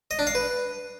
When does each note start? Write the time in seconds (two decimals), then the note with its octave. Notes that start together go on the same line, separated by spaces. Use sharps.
0.11 D#5
0.19 D4
0.27 F5
0.35 B4